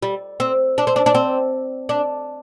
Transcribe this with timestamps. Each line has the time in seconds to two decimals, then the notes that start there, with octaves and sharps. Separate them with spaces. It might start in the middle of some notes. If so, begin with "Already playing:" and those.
0.03 G3
0.40 C4
0.78 D4
0.87 C4
0.96 D4
1.06 D4
1.15 C4
1.89 D4